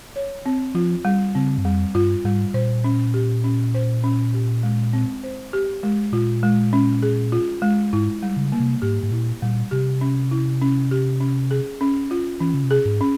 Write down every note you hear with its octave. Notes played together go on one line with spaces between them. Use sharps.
C#5
C4
F3 F4
G3
C#3 C4
G2
F2 G3
G2 F4
G#2 G3
A#2 C5
C#4
G4
C#4
C5
C#4
G4
G#3
C4
C5
G4
G#3
A#2 F4
G#3
C#4
G#4
F4
G#3
G#2 E4
G3
C#3
A#3
C3
G#2 G4
G#2
A#2 E4
A#2 G3
C3 G4
C#4
E4
C#4
G4
C#4
G#4
C#4
F4
E3 C#4
C#3
C3
G#4
G#2
C#4